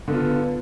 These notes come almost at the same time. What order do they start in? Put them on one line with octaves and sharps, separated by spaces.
D3 B3 F4